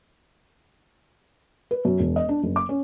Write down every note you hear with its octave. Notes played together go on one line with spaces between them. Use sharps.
B4
F#2
E1
D#5
D4
F#1
D6
C#4